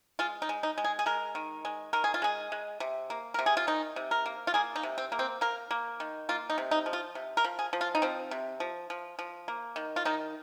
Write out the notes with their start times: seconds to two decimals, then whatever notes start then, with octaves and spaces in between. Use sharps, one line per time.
0.19 G#3 F4
0.42 D#4
0.49 G#3
0.63 D#4
0.78 G#3
0.84 G#4
0.99 G#4
1.06 G#3 A#4
1.35 D#3
1.65 G#3
1.93 D#3 A#4
2.04 G#4
2.14 F4
2.22 G#3 G#4
2.52 G#3
2.80 C3
3.10 A#3
3.34 C3 A#4
3.46 G#4
3.57 F4
3.67 D#3 D#4
3.96 C3
4.11 A#4
4.26 A#3
4.47 F4
4.54 A#3 G#4
4.76 D#4
4.83 C3
4.98 C4
5.12 A#3
5.19 C4
5.41 A#3 A#4
5.71 A#3
6.00 D#3
6.29 A#3 F4
6.50 D#4
6.58 C3
6.71 D#4
6.86 F3
6.93 F4
7.15 C3
7.37 A#4
7.44 F3
7.59 G#4
7.73 F3
7.81 F4
7.95 D#4
8.02 F3 C4
8.31 C3
8.60 F3
8.90 F3
9.19 F3
9.48 A#3
9.76 D#3
9.96 F4
10.05 D#3 D#4